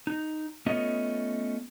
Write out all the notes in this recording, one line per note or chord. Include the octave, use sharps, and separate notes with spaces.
D#4
A3 B3 C#4 F4 D#5